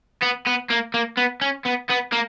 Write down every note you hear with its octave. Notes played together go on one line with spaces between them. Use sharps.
B3
B3
A#3
A#3
B3
C#4
B3
B3
A#3